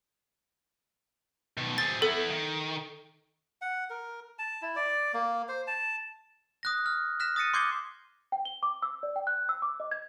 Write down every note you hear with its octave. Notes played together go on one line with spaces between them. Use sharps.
B2 D#3
C4 G#4 A6
B3 E4 A4
D#3
F#5
A#4
A5
E4
D5
A#3
C5
A5
D#6 F#6 A#6
F6
F6 F#6 A#6 B6 E7
D#6 A6 A#6 C#7 D#7
C6 D6 G6 G#6 C7 G7
G5
G7
D6
E6
D5
G5
F#6
E6
D6
D#5
G#6